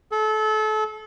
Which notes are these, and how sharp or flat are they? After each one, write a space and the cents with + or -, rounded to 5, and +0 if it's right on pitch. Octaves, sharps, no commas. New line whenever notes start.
A4 -30